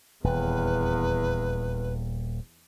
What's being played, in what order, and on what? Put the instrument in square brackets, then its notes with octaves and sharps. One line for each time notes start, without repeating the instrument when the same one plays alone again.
[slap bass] D#1 [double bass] E2 [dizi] B4